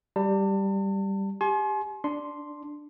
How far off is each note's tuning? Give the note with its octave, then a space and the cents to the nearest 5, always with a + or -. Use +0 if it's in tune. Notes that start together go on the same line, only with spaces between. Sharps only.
G3 +0 A5 +40
G4 +15 G#5 +40 C6 +30
D4 +0 C6 +0